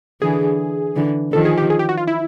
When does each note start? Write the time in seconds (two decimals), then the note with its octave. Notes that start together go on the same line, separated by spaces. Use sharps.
0.22 D3 E3 G#4
0.96 D3 E3
1.33 D#3 F3 A4
1.45 G#4
1.58 G4
1.70 G#4
1.79 G4
1.89 F#4
1.97 F4
2.07 E4